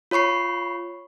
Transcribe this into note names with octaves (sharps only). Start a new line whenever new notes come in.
F4 C#5 B5 C#6 C7